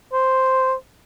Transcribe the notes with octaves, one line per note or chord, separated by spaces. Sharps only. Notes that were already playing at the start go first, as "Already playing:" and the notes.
C5